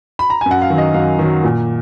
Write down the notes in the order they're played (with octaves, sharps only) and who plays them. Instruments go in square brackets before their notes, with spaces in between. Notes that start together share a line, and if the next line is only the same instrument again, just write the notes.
[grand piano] B5
A#5
F#2 G#5
F#5
F5
D#3 F#3
D#5
F#2 F5
D#3 F#3
A#2